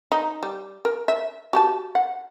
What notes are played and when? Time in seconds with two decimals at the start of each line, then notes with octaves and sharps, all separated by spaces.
0.12 D#4
0.43 G3
0.85 A#4
1.08 E5
1.53 F#4 G4 A5
1.95 F#5